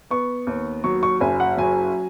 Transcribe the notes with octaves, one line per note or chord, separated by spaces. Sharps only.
B3 C#6
D#2
F#3 C#6
C#6
F#1 G#5
F#5
F#3 G#5